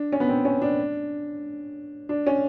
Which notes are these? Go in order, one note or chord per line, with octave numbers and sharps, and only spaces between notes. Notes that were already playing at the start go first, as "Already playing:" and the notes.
Already playing: D4
C#4
B3
C4
C#4
D4
D4
C#4